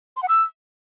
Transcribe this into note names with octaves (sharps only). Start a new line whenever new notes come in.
C6
F#5
E6